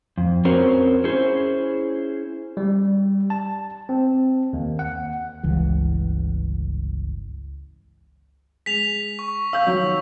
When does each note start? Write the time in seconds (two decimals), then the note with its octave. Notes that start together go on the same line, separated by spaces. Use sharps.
0.18 F2
0.45 C4 C#4 F#4 A#4 C5
1.04 C#4 E4 G#4 C5
2.57 G3
3.30 A5
3.89 C4
4.53 D#2
4.79 F#5
5.43 G1 C#2 C#3 E3
8.66 G#3 B6 F7
9.19 C#6
9.53 F5 E6 G6
9.67 D#3 F#3